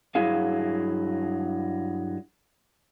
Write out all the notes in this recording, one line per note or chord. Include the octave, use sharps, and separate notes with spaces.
G2 F#3 E4 G#4 F5